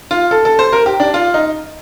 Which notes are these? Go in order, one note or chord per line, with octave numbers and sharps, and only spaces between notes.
F4
A4
A4
C5
A#4
G4
D4
F4
D#4